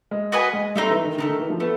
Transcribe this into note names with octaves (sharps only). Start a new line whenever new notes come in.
G#3
F#4 B4 D#5 G#5
G#3
G3 A3 C4 D#4
E3
D#3
D3 A3 C4 D#4
D#3
E3
F3
A3 B3